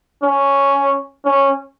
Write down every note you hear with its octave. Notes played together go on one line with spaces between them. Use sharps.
C#4
C#4